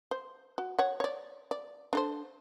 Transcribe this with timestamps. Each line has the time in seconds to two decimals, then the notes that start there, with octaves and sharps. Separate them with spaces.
0.11 C5
0.58 F#4
0.79 C#5 F#5
1.00 C#5 D5
1.51 D5
1.93 D4 A4 C5